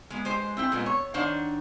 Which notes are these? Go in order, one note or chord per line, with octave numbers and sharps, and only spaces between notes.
G#3 B3
G#3 G4 C5
C4 E4 G5
A#2 G#3 B3
C#5
D#3 D4 C5 C#5 F#5